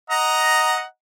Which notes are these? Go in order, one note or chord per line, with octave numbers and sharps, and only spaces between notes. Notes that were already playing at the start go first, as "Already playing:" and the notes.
D#5 F#5 A#5